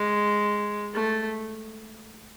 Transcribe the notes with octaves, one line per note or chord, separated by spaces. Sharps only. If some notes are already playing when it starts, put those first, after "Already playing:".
Already playing: G#3
A3